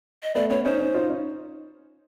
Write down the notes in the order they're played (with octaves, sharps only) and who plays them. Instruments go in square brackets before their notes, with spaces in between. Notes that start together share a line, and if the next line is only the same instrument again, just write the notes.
[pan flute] D#5
[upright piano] A3 B3 [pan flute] D5
[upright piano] B3 C#4 [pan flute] C#5
[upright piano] C#4 D#4 [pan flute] C5
[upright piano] C#4 D#4
D#4 F4
C#4 D#4